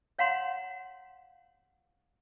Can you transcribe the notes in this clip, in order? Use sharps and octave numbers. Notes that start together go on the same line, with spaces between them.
C#5 F5 F#5 A#5 C6